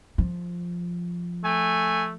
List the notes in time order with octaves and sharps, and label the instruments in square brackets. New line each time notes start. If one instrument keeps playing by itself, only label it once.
[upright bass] F3
[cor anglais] A3 [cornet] G#5